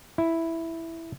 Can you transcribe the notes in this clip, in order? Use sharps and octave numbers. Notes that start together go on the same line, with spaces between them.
E4